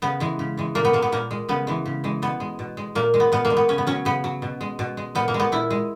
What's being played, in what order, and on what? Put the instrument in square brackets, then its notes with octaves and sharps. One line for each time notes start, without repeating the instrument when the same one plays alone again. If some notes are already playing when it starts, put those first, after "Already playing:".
[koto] C#3 B3
E3 G#3
C#3
E3 G#3
A#2 A#3
B3
G#3 A#3
B3
A#2 A#3
G#3
C#3 B3
E3 G#3
C#3
E3 G#3
B2 B3
G#3
B2
G#3
A#2 A#3
G#3
B3
A#2 B3
A#3
G#3
B3
C#3 C#4
B3
F#3 C#4
C#3 B3
F#3
B2
G#3
B2
G#3
A#2 B3
A#3
G#3
B3
A#2 E4
G#3